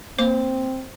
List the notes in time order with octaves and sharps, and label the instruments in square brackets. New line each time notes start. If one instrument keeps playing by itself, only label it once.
[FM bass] A#3 [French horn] C4 [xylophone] C5